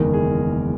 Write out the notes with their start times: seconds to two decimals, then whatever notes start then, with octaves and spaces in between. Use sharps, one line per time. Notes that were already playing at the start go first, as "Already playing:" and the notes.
Already playing: F#1 E2 D#3 G#3 A#4
0.14 G#4